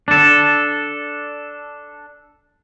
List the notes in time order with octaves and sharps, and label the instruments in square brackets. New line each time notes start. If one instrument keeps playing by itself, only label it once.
[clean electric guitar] D4 A4